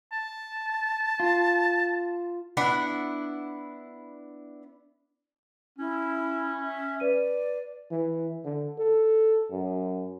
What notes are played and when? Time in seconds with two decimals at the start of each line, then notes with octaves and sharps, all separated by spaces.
0.12 A5
1.20 F4
2.57 B3 D4 E4 F#5
5.78 C#4 E4
6.63 E5
7.00 B4 D5 D#7
7.91 E3
8.44 D3
8.78 A4
9.51 F#2